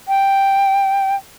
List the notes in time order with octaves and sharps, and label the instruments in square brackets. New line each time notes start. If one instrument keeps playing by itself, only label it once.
[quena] G5